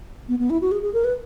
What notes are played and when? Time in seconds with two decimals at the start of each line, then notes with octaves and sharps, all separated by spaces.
0.29 B3
0.39 B3
0.50 E4
0.61 F#4
0.72 G#4
0.83 G#4
0.94 A#4
1.04 B4